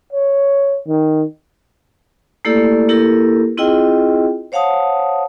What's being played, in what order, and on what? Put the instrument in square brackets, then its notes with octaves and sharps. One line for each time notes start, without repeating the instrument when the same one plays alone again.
[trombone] C#5
D#3
[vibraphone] A3 A#3 E4 G4 A4 D5
A#3 E4 G4 A4 A#4
C4 E4 F4 G#4 D#5 G5
C5 C#5 F5 F#5 A5 D#6